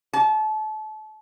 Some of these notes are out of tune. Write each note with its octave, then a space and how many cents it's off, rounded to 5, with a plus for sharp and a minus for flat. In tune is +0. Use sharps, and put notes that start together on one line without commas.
A5 -30